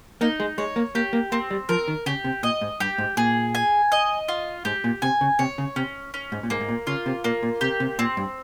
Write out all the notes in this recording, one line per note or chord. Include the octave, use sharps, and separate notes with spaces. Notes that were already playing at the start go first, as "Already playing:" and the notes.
A#3 D#4
G#3
G#3 C#5
A#3
A#3 G4
A#3
A#3 C4
G3
F3 A#4
D#3
C#3 G4
C3
A#2 D#5
G#2
G2 G4
G#2
A#2 G#4
G#5
D#5
F4
G#2 G4
A#2
C3 G#5
C#3
C3 C#5
C#3
C3 C#4
C#4
G#2
A#2
G#2 A#3
G#2
A#2
C#3 F4
C3
A#2 A#3
A#2
C3 G4
C3
A#2 C4
G2